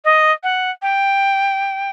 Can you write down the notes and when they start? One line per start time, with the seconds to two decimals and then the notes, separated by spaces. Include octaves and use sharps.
0.05 D#5
0.43 F#5
0.82 G5